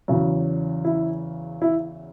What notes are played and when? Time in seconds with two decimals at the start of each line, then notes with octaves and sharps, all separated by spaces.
0.08 E2 C#3 F#3
0.85 E4
1.62 E4